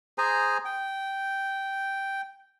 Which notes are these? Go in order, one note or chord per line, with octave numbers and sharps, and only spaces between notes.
G#4 C5 G#5 A#5
G5